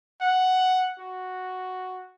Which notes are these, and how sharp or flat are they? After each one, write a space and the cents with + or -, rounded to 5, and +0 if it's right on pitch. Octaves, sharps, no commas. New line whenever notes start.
F#5 +0
F#4 +0